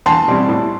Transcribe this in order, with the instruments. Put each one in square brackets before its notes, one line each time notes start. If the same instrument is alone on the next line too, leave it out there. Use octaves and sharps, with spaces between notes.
[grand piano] E2 [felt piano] A5 C6
[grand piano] B2 G3 C4 E4
A2